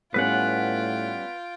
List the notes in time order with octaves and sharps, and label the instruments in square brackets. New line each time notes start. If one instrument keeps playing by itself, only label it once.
[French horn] A2 [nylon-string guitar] G3 B3 C#4 [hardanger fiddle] F4 G5 [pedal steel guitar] B4 F#5